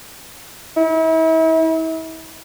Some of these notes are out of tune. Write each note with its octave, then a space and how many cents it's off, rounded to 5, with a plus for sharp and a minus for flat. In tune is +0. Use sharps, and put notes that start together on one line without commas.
E4 -40